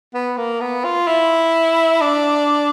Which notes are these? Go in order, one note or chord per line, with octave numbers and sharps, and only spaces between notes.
B3
A#3
B3
F4
E4
D4